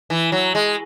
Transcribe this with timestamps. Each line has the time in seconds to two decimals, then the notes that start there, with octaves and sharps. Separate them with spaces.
0.10 E3
0.32 F#3
0.55 G#3